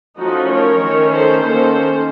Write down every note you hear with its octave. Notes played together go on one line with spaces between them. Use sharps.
F3 A3 C#4 D#4 F#4
A#4 C#5
D#3 A3 C#4
A4 C5
D#3 A#3 C#4 A4 C5